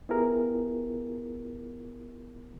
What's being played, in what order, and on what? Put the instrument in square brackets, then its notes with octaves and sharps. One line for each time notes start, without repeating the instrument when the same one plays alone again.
[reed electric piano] B3 E4 F4 G4 G#4 A#4